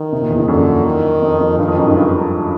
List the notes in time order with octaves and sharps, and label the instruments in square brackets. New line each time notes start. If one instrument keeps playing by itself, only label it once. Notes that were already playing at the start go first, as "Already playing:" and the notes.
Already playing: [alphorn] D#3
[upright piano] C3
A#2
E2
F2
[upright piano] F#2 [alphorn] D3
[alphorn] D#3
[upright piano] F2
F2
[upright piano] G2 [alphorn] D#3
[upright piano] F2
F#2
G#2
G2